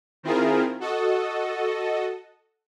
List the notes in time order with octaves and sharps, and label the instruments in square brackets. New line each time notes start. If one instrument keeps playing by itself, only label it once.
[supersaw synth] D#3 C4 E4 F4 G#4 A#4
F#4 A4 D#5